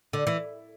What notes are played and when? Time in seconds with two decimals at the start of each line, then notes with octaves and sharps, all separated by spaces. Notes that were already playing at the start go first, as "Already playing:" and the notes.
0.13 D3
0.27 E3